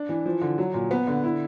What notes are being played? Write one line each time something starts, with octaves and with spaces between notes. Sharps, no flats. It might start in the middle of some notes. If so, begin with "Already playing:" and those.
Already playing: D4
E3
F3
D3
F#3
A#2
B3
D3
E4